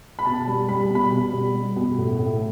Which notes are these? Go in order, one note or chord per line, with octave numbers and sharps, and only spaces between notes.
B5
B2 A5
G3
G3 B5
B2
B5
B2
G3
G3
B2
A2
A2